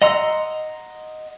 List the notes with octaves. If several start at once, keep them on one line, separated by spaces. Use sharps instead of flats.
D#5 F#5 A#5 C6 E6